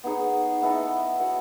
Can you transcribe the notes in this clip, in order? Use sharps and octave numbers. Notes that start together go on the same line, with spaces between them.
B3 D#4 G#4 C#5
B3 E4 A4 D#5
B3 F#4 C#5